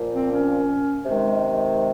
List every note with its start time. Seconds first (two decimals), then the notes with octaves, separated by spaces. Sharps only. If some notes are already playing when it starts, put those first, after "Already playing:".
Already playing: A#2 F3
0.11 C4
0.30 C#4
1.05 C3 D#3 G#3